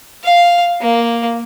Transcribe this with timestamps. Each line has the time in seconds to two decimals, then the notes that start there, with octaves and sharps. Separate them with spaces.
0.24 F5
0.81 A#3